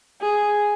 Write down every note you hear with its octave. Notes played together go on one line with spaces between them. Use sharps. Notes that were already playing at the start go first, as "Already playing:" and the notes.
G#4